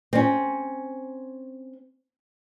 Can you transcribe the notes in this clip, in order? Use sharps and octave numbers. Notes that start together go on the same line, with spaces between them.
C4 C#4